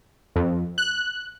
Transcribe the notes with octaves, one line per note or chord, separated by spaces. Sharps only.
F2
F#6